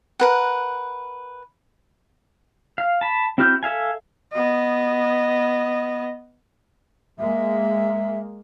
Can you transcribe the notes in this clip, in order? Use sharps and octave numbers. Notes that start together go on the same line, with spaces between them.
A#4 B4 F#5
F5
A5 B5
C4 E4 F#4 F6 G6
A4 E5 F5 G#5
B3 D#5
G#3 A#3 E5